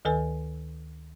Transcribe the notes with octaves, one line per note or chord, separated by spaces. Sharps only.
D2 D#3 A4 B4 G#5